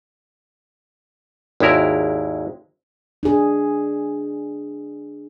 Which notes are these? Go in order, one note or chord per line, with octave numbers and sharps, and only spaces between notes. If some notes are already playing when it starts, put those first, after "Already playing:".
G#1 D#2 G#3 E4 A#4
D4 G#4